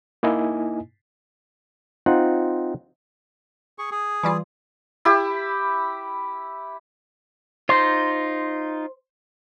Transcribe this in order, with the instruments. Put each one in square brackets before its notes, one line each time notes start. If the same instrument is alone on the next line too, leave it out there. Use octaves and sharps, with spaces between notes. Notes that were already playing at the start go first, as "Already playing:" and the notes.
[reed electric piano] A#3 D#4 E4 D#5 G#5
[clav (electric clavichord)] C4 D#4 F4 F#5
[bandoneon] G#4 C#6
G#4
[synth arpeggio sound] E3 G3 F4
[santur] E4 G4
[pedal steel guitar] D#4 F4 [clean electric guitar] C5